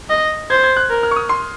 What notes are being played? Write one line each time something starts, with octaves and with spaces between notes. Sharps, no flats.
D#5
C5 G#6
G#6
F#6
A#4
F6
C#6
D#6
C6